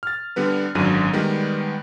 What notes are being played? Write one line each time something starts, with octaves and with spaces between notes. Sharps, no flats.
F6 A6
D3 G3 B3 B4
G#1 F#2 D3 F#3 D#7
D#3 G3 G#3 B3 B4